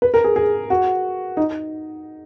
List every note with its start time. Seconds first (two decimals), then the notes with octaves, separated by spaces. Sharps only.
0.02 B4
0.14 A#4
0.24 G#4
0.36 G#4
0.70 F#4
1.37 D#4